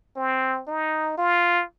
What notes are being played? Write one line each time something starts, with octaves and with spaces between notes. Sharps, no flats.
C4
D#4
F4